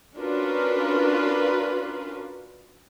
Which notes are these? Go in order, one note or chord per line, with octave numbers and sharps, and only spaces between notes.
C#4 D4 F4 F#4 A#4 B4